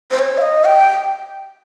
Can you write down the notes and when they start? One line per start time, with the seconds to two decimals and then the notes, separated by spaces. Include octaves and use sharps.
0.11 C5
0.19 C#5
0.38 F5
0.41 D#5
0.65 G5